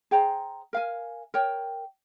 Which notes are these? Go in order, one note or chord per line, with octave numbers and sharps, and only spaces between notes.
G#4 C5 G5 A#5
A#4 F5 G#5
A#4 C#5 G5